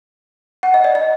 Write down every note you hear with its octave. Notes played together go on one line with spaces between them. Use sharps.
F#5
D#5
D5
D#5